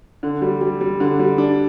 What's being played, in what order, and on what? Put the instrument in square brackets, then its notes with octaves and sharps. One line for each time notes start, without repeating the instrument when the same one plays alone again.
[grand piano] D3
G3
G3
G3
D3
G3
D4